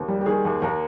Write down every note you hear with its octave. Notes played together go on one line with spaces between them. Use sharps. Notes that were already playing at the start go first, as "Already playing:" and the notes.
Already playing: D#2
G3
G4
D#3 G#4
D#2
D#2 A#4